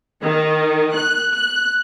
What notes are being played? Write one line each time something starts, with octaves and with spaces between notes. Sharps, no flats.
D#3
F#6
F#6